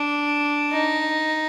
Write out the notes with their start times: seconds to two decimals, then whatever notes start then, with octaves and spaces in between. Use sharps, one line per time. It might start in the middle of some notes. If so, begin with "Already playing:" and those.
Already playing: D4
0.72 D#4